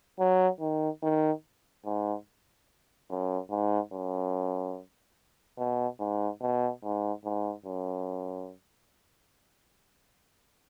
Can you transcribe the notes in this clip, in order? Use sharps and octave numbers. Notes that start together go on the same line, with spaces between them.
F#3
D#3
D#3
G#2
F#2
G#2
F#2
B2
G#2
B2
G#2
G#2
F#2